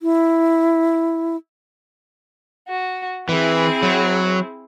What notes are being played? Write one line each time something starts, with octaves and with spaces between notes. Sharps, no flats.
E4
F#4
E3 C4 E4 G#4
F#3